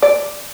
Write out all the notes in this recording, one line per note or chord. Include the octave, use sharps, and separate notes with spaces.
D5